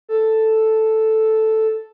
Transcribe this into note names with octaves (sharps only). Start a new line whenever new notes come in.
A4